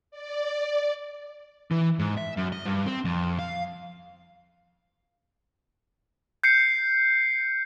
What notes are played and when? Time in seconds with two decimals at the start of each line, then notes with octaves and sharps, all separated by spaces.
0.11 D5
1.71 E3
1.99 G#2
2.17 E5
2.37 F#2
2.52 D#5
2.66 G2
2.86 C4
3.05 F2
3.39 F5
6.44 G6 C7 C#7